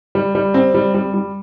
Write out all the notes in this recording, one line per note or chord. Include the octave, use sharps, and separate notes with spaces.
G3
G3
C4
G3
G3
G3